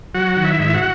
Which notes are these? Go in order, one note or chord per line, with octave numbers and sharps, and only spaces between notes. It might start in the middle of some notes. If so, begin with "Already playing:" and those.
F#3 F#4 F#5
D#3
E4 E5
G#2
F#4 F#5